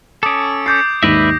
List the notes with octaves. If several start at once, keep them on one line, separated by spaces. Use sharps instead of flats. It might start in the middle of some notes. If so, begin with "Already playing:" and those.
C#4 A4 D6 D#6 D7
D6 G6 A6 C7
D#2 G#2 D#3 B4 D5 E5 A#6